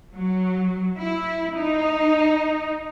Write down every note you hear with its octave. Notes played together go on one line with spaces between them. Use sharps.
F#3
E4
D#4